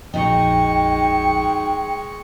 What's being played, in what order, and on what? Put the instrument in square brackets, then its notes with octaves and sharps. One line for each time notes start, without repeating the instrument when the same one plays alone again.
[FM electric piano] A#1 F2 [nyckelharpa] G#3 C#6 [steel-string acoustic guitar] D#4 F#4 D#5 [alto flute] G5